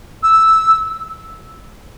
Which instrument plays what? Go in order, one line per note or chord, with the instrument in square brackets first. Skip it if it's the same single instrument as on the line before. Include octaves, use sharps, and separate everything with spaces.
[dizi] E6